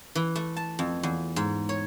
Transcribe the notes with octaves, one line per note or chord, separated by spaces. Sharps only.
E3
A3
A5
F2
E2
G#2
C#5